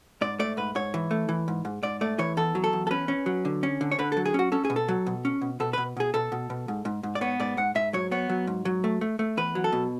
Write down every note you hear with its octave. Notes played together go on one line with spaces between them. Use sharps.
G#2 D5
A3 D5
G#2 B4
G#2 C#5
E3
A3
E3
G#2
G#2
G#2 D5
A3 D5
E3 C#5
E2 A4
F#3
A4
E2
A4
C#4 B4
C#4
F#3
D3
C#4
D3
C#5
D3 B4
A4
F#3
G#4
C#4 F#4
C#4 A4
G#4
B2
A4
F#3
B2
C#4
B2
B2 A4
B2 B4
B2 G#4
B2 A4
B2
B2
G#2
G#2
G#2
D5
B3 C#5
G#2 D5
G#2 F#5
G#2 E5
F#3 C#5
B3 C#5
F#3
G#2
F#3
A3
A3
A3
E2 B4
F#3
A4
B2